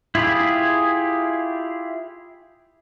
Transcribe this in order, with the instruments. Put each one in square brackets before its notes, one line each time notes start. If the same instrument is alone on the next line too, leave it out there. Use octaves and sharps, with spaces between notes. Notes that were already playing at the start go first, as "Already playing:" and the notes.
[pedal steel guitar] E4 F4 G4 G#4 B5